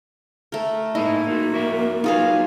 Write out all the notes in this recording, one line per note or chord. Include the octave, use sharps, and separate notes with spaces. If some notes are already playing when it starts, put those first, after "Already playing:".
A3 A#4
A#3 D#4 E4 G#4 D#5
D#4 F#4
F#4 A#4 E5
D#4 F4 F#4 G#4 B4 F5